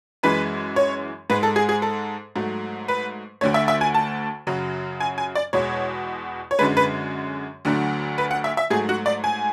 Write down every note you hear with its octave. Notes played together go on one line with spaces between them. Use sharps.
F#2 E3 G#3 B4
C#5
G#2 G#3 B4
A4
G#4
G#4
A4
G#2 F#3 A3
B4
D2 D3 A3 C#5
E5
E5
G#5
A5
F#2 C#3 F#3
G#5
G#5
D5
E2 B2 G#3 C#5
C#5
F#2 D3 G#3 B4
B4
D2 D3 F#3 A3
B4
F#5
E5
E5
G#2 F#3 A3 G#4
F#4
D5
G#5